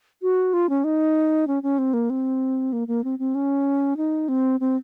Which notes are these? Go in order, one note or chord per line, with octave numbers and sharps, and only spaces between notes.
F#4
F4
C#4
D#4
C#4
C#4
C4
A#3
C4
A#3
A#3
C4
C4
C#4
D#4
C4
C4